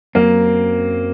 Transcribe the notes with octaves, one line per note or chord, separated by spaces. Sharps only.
F#2 F#3 A#3 C4